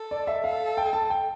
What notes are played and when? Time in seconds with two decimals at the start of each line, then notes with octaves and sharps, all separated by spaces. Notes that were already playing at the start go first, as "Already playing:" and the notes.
Already playing: A4
0.11 D5
0.27 E5
0.44 A4 F5
0.77 G5
0.93 A5
1.10 G5